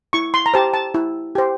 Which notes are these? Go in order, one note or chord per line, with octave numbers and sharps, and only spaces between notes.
E4 C#6
C6
A#5
G4 C5 A5
A5
E4
G4 C5